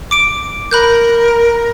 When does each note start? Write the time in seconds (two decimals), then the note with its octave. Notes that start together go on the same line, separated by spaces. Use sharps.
0.11 D6 D7
0.71 A#4 B5 F#6 G6